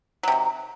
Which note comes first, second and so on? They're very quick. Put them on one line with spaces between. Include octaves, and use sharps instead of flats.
F#3 C3 D#3